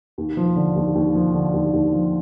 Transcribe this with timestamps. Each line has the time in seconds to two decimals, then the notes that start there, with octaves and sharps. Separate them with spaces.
0.18 D#2
0.37 F3
0.56 D3
0.76 D#2
0.95 D#2
1.15 F3
1.34 D3
1.54 D#2
1.73 D#2
1.92 F3